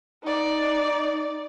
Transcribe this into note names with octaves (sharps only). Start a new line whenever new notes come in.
D#4 D5